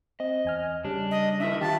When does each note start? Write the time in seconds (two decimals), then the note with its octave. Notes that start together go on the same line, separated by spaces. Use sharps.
0.20 C4 D#5
0.45 E2 G#5 F6
0.85 C#3 G3 C#4 D4
1.11 D#5
1.40 D4 E4 A#4 E5
1.61 D#3 F#3 F4 G4 A5